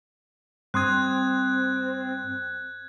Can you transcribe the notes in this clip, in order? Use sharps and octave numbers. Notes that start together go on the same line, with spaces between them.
G2 C4 C6 D#6 F#6 G#6